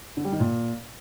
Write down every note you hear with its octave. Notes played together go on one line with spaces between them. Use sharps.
D3
G3
D#3
A#2